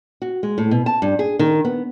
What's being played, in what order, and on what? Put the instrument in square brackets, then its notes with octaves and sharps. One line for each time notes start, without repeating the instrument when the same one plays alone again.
[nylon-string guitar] F#4
G#3
A2
B2
A5
G2
G#4
D#3
B3